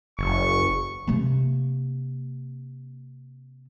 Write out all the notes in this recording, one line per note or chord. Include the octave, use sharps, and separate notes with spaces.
F#1 C#6
C3 A#3